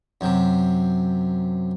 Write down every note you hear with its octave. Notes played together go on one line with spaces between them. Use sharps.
F#2 C3